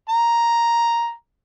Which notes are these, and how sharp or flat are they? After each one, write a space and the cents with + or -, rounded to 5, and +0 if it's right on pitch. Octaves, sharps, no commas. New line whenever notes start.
A#5 +5